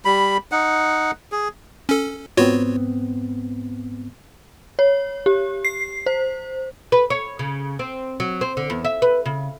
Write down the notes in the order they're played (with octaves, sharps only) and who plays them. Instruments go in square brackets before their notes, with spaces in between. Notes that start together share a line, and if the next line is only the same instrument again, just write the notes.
[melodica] G3 B5
D#4 F#5
G#4
[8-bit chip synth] C#4 A4
[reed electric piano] G#2 B3 C4 [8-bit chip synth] F4 F#4 C#5
[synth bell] C#5
G4
C7
C5
[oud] B4
C#5
C#3
C4
F#3
C4
D3
E2
E5
B4
C#3